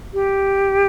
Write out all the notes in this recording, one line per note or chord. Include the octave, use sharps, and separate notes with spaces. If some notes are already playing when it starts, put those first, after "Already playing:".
G4